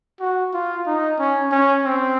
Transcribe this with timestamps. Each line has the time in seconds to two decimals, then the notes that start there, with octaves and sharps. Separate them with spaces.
0.20 F#4
0.54 F4
0.86 D#4
1.19 C#4
1.52 C#4
1.85 C4